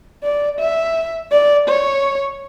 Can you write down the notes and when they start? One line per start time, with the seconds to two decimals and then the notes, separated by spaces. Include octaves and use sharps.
0.23 D5
0.60 E5
1.32 D5
1.68 C#5